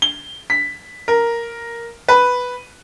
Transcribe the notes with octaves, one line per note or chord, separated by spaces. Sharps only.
G7
B6
A#4
B4